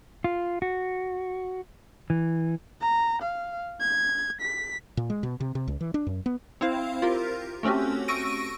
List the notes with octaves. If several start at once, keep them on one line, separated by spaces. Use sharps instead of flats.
F4
F#4
E3
A#5
F5
G#6
B6
A#2
G#3
B2
C3
C3
C#2
E3
D4
F#2
B3
C4 E4 C5 F5
F4 G4 A#4
A3 C4 C#4 F#4 G4
C#6 E6 A#6 D7 D#7